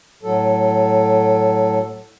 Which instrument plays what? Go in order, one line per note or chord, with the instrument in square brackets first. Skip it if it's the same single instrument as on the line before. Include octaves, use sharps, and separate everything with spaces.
[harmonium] A2 F#3 A4